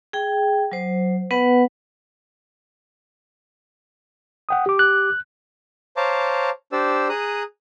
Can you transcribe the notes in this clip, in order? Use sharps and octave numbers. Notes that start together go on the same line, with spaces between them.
G#4 G5
F#3 C5
B3 B4 F#5
F#5 G5 D#6
G4 D6
F#6
C5 C#5 F5 A5 A#5 D6
D4 G4 C5 D5 E6
G#4 A#5 D#6 F#6